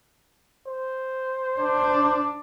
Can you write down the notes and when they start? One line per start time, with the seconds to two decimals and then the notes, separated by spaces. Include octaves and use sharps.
0.67 C5
1.60 D4